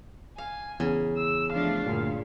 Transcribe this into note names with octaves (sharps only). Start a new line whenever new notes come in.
F5 G#5
E2 C#3
E6
F3 A3 D4 F5
D2 G2 A#2